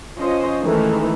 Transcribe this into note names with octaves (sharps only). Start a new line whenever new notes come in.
F3 C#4 C5 D#5
D#3 E3 G#3 A3